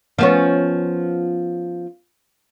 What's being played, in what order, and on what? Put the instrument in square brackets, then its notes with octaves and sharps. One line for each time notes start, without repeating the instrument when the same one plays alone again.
[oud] F3 B3 C#4